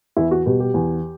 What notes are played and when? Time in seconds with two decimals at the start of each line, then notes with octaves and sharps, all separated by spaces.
0.17 E2 E4
0.31 F#4
0.45 B2 G3 G4
0.60 G4
0.74 E2